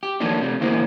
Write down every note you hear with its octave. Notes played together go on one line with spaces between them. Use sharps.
G4
D#3 F3 F#3 A3 A#3 D4
C3 A3
E2 D3 A#3 E4 C5